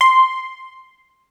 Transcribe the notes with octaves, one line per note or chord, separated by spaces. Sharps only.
C6